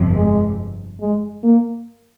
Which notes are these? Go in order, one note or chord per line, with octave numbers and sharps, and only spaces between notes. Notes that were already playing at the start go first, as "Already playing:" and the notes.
Already playing: G1 F2 C3 F3
G#3
G#3
A#3